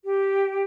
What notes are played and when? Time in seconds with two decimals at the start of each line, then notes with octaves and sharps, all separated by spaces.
0.05 G4